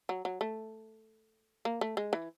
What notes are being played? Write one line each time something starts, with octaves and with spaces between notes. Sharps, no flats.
F#3
F#3
A3
A#3
A3
G#3
E3